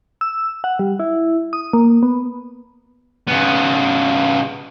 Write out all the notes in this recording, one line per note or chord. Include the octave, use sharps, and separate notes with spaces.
E6
F#5
G3
E4
D#6
A#3
B3
C#3 B3